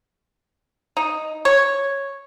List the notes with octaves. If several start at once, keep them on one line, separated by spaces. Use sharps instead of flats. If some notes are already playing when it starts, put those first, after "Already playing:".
D#4
C#5